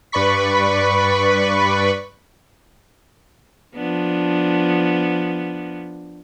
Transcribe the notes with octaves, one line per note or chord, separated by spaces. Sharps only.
G2 B4 D5 B5 C#6 B6
F3 B3 D4